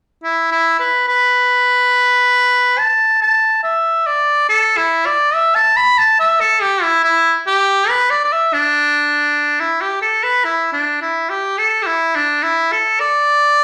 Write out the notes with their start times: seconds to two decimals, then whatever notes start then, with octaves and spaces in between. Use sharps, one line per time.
0.23 E4
0.51 E4
0.79 B4
1.08 B4
2.78 A5
3.21 A5
3.63 E5
4.06 D5
4.49 A4
4.77 E4
5.06 D5
5.34 E5
5.55 A5
5.76 B5
5.98 A5
6.20 E5
6.40 A4
6.61 G4
6.82 E4
7.03 E4
7.47 G4
7.89 B4
8.10 D5
8.24 D5
8.32 E5
8.53 D4
9.60 E4
9.81 G4
10.02 A4
10.23 B4
10.45 E4
10.73 D4
11.01 E4
11.30 G4
11.58 A4
11.82 G4
11.87 E4
12.15 D4
12.43 E4
12.72 A4
13.00 D5